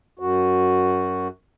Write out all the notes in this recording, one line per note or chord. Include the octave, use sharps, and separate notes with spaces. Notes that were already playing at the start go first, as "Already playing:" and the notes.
F#2 F#4